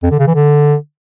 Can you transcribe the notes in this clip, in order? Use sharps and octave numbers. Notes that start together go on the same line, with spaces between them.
F2
D3
C#3
E3
D3